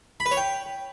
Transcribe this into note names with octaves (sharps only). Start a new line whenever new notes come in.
B5
B4
C#5
G5